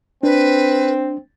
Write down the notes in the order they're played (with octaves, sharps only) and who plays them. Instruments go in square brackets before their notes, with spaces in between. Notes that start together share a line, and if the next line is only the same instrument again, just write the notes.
[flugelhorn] C4 [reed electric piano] D4 [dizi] B4